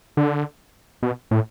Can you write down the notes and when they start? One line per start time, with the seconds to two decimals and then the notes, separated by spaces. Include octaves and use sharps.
0.17 D3
1.03 B2
1.31 A2